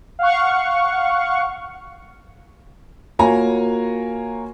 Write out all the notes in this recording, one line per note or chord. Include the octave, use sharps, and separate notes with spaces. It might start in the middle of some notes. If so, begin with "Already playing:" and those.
F5 F#5 C#6
A#3 F4 F#4 C#5 G#5 A#5